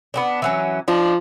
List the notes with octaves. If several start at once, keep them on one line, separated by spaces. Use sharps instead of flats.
B3 C#4 D4
E3 F#3 C#4
F3 D4 D#4